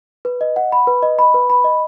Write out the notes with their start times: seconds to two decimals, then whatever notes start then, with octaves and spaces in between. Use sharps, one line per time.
0.25 B4
0.41 D#5
0.56 F#5
0.72 B5
0.87 B4
1.03 D#5
1.19 B5
1.34 B4
1.50 B5
1.64 D#5